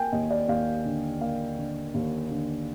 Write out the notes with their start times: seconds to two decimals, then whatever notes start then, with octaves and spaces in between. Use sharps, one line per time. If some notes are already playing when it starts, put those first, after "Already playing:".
Already playing: A#3 G5 G#5
0.12 D#2 D#5
0.30 D5
0.48 D#2 F5
0.85 D3
1.21 A#3 F5
1.58 D3
1.94 D#2
2.31 D3